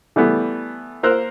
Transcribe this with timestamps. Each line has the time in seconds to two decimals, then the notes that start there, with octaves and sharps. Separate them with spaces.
0.16 E3 G3 A3 B3
1.03 A#3 A#4 C5 E6 F#6